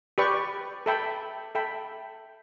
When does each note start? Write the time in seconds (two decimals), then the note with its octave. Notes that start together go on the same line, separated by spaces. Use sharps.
0.18 G4 B4 D5 G5 C#6
0.86 A4 E5 G5 B5
1.55 A4 E5 G5 B5